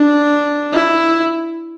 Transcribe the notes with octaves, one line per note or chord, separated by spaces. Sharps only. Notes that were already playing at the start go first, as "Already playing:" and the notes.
Already playing: D4
E4